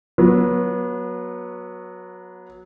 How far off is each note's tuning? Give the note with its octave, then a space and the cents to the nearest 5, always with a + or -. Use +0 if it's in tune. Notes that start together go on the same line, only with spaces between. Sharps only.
F#3 -10 B3 -30